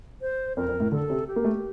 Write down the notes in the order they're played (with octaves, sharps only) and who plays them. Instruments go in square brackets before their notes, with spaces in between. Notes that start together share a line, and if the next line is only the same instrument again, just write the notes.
[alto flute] C5
[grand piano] F2 [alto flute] A#4
[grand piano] F2
A2
[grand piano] D3 [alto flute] A4
[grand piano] C3
[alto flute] G4
[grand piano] A#3
A3